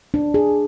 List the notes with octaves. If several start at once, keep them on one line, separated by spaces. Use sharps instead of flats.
D4
G#4